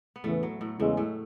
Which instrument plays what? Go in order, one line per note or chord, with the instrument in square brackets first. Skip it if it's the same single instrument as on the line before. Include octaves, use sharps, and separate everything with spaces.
[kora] B3
[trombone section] E2 C#3 E3 [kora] A2 A3
[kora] F#3
A2 A3
[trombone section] E2 C#3 G#3 [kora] A2 A3
[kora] A2 A3